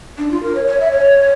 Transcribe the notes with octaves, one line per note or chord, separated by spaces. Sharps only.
D4
F4
A#4
C#5
C#5
E5
C#5